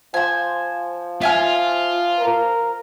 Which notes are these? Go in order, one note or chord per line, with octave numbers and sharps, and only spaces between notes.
F3 C5 G#5
F4 E5 G#5 F6
A#4